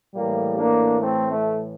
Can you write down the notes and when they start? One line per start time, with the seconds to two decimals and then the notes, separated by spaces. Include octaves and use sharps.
0.14 A2 E3 G3 A#3
0.57 A#3 D4
1.00 A3 C4
1.29 A3